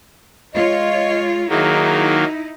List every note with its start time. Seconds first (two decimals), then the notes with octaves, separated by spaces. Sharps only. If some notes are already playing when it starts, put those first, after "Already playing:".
0.54 G#3 F4 C#5 D#5
1.50 D#3 F#3 A#3 D#4 E4 G#4